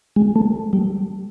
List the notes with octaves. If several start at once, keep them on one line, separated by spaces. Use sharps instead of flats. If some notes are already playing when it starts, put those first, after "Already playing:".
G#3
A3
G3